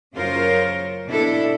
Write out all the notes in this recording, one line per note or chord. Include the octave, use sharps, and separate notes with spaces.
F#2 C#3 F4 A#4 C5 C#5
B2 D4 E4 A4